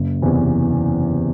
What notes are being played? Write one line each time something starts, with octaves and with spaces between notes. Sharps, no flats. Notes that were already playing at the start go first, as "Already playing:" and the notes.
Already playing: F#1
E2 C3 E3